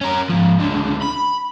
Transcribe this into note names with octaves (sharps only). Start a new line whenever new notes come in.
C#4 A#4
G#2 F3
C#2 D3
B5